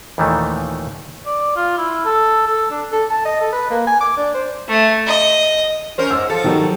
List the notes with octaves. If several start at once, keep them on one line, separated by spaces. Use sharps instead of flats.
D#2 A#2 D#3 E3 A3
D5
F4
E4
A4
A4
D4
A4
A5
D#5
A4
B4
A#3
G#5
D6
D4
C5
A3
D#5
C#4 A#4 C5
G#2 E6
F3 A4
D#3 F#3 G3